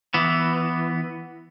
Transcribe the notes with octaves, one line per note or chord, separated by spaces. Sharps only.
E3 B3